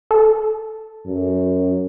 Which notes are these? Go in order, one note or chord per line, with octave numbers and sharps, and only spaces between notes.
A4
F#2